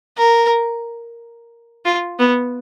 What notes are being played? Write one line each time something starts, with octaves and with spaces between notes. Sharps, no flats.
A#4
F4
B3